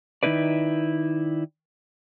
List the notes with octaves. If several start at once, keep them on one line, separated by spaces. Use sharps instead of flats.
D#3 G#3 D#4 E4 B4 D5